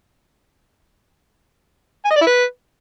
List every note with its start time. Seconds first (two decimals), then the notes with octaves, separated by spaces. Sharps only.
2.05 G#5
2.10 D#5
2.16 D5
2.21 E4
2.27 B4